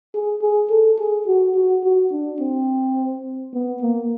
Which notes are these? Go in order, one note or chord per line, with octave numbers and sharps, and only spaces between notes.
G#4
G#4
A4
G#4
F#4
F#4
F#4
D4
C4
B3
A#3